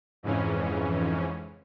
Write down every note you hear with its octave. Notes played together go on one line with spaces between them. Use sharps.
F2 G#2 C#3 E3 C#4